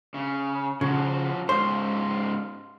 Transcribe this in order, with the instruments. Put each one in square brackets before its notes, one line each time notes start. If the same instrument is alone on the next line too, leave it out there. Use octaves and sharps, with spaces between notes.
[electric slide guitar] C#3
[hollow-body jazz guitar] C#3 [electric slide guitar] F3 F#4 C5
[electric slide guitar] G#2 C#3 F4 [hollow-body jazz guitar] C5